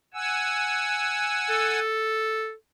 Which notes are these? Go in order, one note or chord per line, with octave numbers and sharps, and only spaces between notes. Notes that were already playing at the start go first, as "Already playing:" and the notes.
F#5 G#5 E6
A4